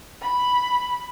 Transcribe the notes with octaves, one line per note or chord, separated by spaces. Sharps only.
B5